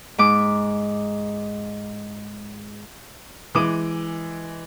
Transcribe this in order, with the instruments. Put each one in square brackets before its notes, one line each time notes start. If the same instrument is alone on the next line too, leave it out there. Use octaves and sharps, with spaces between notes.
[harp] G#2 D6
[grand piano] E3 G#3 D6 D#7